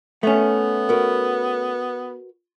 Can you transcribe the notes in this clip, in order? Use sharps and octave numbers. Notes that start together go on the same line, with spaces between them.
A3 B3 C#4
F#4 A#4 B4